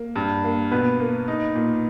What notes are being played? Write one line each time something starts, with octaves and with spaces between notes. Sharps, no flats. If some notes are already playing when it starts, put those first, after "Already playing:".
Already playing: A#3
G2
A#3
B2 B3 B4
A#3
D#4
A#2